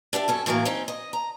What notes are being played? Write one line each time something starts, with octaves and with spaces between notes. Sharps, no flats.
D4 G4 D5 E5
F#2 C#4 A4
A2 E3 F#3 A3 A#3
C4 C#4 D#4
D#5
A#5